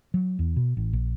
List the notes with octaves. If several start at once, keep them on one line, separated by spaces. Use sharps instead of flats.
F#3
E2
B2
A1
A#1